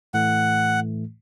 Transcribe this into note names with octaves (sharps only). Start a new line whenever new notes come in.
A2 E3 A3 F#5